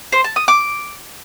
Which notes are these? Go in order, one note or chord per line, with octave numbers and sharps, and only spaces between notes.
C5
A5
D#6
D6